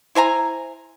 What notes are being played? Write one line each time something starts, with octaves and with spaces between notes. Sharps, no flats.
E4 C5 G#5 A#5